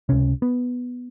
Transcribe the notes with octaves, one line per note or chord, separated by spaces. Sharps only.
C#2 C3 C#4
B3